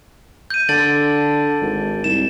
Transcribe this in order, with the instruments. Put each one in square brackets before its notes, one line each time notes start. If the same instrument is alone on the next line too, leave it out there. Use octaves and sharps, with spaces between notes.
[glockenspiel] G6 D#7
[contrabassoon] D3 [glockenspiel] A6 D7 F#7
[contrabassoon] G#1
[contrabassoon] C2 [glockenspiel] E7